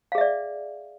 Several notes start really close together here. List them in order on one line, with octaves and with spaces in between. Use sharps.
F5 G#4 E5 D5